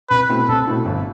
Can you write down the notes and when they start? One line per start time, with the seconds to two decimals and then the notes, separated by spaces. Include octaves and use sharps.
0.10 C2 B4
0.29 B2 A3 C4 E4
0.48 C2 A4
0.67 B2 A3 C4 E4
0.85 G1